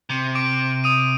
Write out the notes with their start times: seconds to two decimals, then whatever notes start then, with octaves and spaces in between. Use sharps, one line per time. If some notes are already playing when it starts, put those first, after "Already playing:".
0.10 C3
0.35 D6 D7
0.84 D#6 D#7